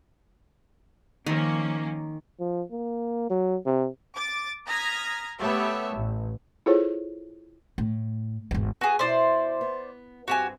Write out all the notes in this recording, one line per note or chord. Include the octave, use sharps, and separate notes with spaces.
D#3 F3 A#3 C#4
F3
A#3
F#3
C3
D6 A6
A#5 D#6 F6 G#6 A#6 B6
A3 B3 G4 A4 C#5 E5
A1
E4 F4 G#4 A4 C5 C#5
A2
G#1 E2
B3 F#4 G#4
B2 E4 C5 D5
B3
G2 C4 F#4 G4 G#5